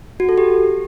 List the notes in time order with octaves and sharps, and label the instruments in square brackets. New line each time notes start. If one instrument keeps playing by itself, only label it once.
[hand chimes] F#4
A4
G4